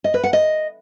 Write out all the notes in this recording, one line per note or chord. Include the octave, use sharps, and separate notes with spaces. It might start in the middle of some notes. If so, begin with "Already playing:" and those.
D#5
B4
F#5
D#5